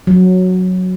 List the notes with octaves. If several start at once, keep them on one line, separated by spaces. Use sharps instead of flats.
F#3